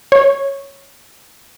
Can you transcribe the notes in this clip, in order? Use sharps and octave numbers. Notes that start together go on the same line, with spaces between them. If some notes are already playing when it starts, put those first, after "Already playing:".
C#5